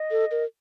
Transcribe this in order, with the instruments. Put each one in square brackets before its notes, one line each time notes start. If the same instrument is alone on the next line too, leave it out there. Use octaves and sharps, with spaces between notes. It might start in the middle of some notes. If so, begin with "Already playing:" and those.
Already playing: [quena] D#5
[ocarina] A4
A#4